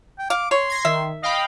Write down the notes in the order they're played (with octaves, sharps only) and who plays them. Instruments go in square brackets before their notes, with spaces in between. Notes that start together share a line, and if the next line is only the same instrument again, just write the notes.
[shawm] G5
[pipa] F5 [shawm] D6
[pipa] C#5 [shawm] C6
[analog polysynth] G#6 A#6 C7
[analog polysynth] D#3 [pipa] E5
[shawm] D#5 [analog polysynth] F5 G5 B5